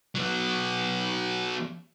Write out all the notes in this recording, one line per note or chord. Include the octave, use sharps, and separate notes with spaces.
F#3 B3